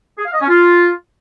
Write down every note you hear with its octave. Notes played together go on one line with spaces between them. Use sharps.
G#4
F5
D#5
C#4
F4